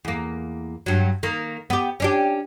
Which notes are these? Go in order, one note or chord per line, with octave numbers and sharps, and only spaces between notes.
E2 A#3
G2 F#3
D#3 A#3
B3 G4
C#4 D4 G4